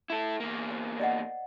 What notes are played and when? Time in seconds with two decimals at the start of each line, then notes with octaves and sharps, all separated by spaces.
0.10 E4 A4
0.40 E2 A#3
0.71 C5
0.99 D5 D#5 F#5